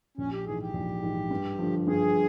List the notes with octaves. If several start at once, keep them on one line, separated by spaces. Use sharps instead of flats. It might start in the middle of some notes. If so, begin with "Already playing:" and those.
A#1 C#4
G4
G#2 E3 G#4
G4
A#1
G#2 E3
G2
D3 F3
G2 G#4